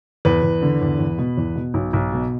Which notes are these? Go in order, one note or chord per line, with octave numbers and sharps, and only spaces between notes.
E2 B4
E2
D3
E2
E2
B2
E2
B2
B1
B1
B2